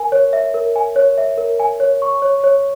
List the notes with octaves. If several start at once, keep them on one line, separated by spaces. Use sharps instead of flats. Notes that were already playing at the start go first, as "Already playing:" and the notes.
Already playing: A#4 G#5
C#5
E5
A#4
G#5
C#5
E5
A#4
G#5
C#5
C#6
C#5
C#5